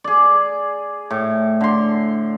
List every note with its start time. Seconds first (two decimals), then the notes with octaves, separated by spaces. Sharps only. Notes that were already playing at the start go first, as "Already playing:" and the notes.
0.04 G#4 D5
1.10 A2
1.61 D3 C6